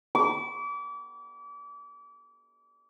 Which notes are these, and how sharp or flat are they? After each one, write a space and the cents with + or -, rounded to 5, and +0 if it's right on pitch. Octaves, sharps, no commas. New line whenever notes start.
D6 -35